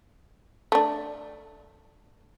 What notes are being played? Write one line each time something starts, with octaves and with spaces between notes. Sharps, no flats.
A3 D4